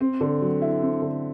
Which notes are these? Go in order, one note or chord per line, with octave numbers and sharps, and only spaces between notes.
C4
D3
F#3
E4
C4
D3